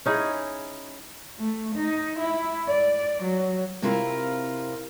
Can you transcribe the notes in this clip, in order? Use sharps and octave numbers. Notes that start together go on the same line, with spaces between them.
C#4 D#4 E4 G#4
A3
D#4
E4
D5
F#3
C3 C4 E4 F4 A#4 F5